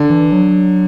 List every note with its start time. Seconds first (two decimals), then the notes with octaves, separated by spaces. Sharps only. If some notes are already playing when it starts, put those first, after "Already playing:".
Already playing: D3
0.10 E3
0.32 F#3